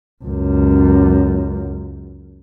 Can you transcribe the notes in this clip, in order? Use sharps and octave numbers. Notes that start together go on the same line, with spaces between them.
C#2 F#2